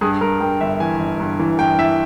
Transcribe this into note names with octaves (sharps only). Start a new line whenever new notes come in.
G2 G#4
G2 A#4
G2 G5
G1 E5
E3 G#5
G1
G2
E3
G2 G5
E3 E5